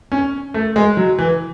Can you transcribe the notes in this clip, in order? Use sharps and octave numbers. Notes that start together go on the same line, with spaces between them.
C#4
A3
G#3
F#3
E3